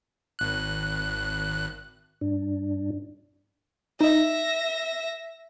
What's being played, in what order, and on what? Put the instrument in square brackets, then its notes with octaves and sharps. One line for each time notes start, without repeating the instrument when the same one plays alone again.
[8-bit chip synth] G#1 F#6
[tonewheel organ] G2 D4
[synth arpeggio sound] D#4 D#5 [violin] E5 A#6